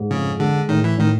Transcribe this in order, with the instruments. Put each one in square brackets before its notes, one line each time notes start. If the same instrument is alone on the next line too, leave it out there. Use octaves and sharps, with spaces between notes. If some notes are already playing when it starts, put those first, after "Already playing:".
Already playing: [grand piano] G#2
[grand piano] F2 [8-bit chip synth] C#3
[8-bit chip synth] D3 [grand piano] G#3
[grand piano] A2 [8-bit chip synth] D#3
[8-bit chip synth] E3
[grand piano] A2 [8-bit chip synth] D#3